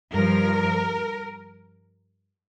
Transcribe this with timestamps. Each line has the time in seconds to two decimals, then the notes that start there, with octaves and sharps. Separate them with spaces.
0.12 G2 F3 A#4